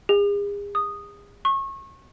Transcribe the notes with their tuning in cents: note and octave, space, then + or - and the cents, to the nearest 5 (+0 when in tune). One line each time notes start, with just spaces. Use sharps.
G#4 -40
D#6 -10
C#6 -30